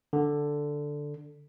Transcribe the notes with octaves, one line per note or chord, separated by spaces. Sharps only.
D3